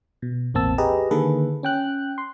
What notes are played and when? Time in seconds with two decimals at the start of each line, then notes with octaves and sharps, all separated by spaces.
0.22 B2
0.54 A1 E2 A#3 C4 A5 E6
0.78 G4 G#4 B4 D#5 A#5
1.11 D3 D#3 A#3 G#4 A4 B4
1.63 C#4 G5 F#6
2.18 C6